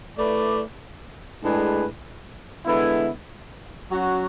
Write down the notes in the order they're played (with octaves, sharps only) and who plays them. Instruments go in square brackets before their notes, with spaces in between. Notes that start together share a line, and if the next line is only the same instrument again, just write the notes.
[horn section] A3 E4 B4 D5
A2 G#3 D4 G#4 B4
D3 G#3 B3 E4
F#3 C#4 F#4